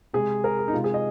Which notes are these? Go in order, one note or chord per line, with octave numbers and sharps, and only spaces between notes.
C3 G#3 G#4
A#4
G#4
D#4
C3 G#3 F4
G#4
D#5